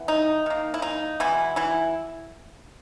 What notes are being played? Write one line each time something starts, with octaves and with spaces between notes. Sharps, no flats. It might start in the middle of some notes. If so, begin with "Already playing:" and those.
Already playing: E3 B3
D#4
D#3 A#3
E4
D#4
B2 E3 G#3 B3 E4
E3 E4